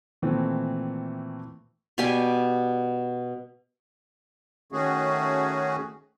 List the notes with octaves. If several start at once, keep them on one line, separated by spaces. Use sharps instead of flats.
A#2 D#3 E3 A3 C4
B2 G3 G4 G#5
D#3 A3 C#4 F#4 G#4